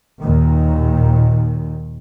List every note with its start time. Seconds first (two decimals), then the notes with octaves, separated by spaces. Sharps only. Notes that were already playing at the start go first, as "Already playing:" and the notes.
0.21 D#2 A#2 D#3